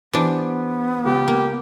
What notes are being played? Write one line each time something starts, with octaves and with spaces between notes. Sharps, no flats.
E3 B3 D4 G4 C5 D6
C#2 G4
A#3